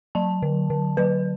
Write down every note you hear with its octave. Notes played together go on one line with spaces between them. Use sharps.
F#3 A5
D3
D3
F#3 B4